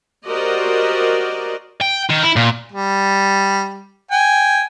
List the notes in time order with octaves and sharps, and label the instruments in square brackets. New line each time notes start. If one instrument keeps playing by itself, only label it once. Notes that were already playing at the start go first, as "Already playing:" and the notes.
[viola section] F#4 G4 A#4 C5 D5 D#5
[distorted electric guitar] G5
D#3
E4
A#2
[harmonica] G3
G5 G#5